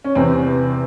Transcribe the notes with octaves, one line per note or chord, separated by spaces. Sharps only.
C#4
E2 C3 E3 C4